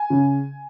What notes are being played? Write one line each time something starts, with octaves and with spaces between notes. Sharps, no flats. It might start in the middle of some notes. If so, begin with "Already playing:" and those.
Already playing: G#5
C#3